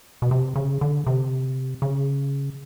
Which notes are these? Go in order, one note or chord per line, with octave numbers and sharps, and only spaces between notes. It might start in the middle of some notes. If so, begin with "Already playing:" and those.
B2
C3
C#3
D3
C3
C#3